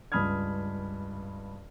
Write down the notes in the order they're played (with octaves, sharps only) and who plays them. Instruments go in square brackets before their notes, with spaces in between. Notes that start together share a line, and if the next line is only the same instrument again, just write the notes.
[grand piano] C#2 G2 B5 D#6 F6 G#6